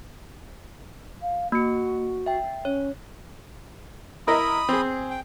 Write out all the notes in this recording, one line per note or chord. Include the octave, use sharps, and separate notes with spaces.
F5
A#3 F#4 C#7
E5 G5
C#4 C#5
E4 A#4 D#5 B5 D#6
C4 G#4
G5